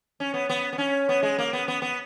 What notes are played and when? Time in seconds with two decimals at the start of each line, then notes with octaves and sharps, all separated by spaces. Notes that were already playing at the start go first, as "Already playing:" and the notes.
0.20 C#4
0.34 B3
0.49 B3
0.73 B3
0.78 C#4
1.09 B3
1.23 G#3
1.38 A#3
1.53 B3
1.68 B3
1.82 B3